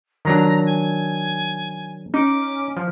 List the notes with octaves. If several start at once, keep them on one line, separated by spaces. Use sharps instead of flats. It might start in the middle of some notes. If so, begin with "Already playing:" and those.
D#3 F#3 D4 A#5
G#5
C#4 D#4 D6
F3